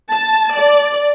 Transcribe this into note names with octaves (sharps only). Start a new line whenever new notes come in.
A5
D5